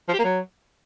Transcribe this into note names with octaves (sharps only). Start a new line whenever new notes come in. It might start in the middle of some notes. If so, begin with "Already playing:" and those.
F3
G4
A#3
F#3